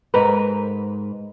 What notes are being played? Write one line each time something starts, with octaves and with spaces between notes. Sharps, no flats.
G#2 A#4 B4